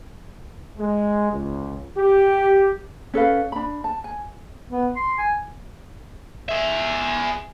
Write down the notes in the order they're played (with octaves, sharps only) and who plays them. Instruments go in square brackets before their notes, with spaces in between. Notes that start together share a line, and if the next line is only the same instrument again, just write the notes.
[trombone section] G#3
C#2
G4
[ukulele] C#4 A4 B4 F5
D4 B5
A5
G#5
[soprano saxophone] B3
C6
G#5
[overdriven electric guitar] G#4 E5